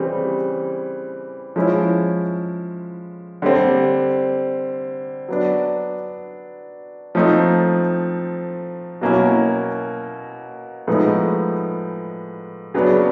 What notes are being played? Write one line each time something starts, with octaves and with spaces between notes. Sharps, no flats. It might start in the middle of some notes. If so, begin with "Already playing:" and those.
Already playing: C#3 E3 G3 C4
F3 G#3 C#4 E4
D3 G3 C4
F#3 B3 D4
F3 A3 C4 D#4
B2 F#3 A#3 C#4 E4
A2 F3 G#3 B3 D#4
C#3 F#3 B3 D4